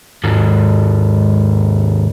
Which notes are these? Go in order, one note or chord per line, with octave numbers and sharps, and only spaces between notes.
D#2 G#2